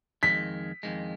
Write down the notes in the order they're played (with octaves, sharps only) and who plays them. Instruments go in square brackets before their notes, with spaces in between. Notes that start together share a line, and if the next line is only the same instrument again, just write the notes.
[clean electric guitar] F2 D#3 G#3 [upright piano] B6
[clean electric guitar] F2 D#3 G#3